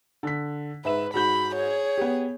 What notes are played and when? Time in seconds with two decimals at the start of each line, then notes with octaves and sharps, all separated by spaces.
0.23 D3 B6
0.85 G#2 B4 E5 E7
1.14 G#2 F#4 B5 G6
1.54 G#4 C#5
1.98 B3 G4